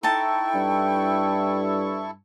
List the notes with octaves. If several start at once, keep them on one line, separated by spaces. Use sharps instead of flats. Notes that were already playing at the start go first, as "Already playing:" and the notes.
D#4 E4 A4 G5 A5 C#6
G2